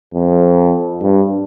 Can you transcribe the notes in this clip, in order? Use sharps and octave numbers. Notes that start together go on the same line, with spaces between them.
F2
G2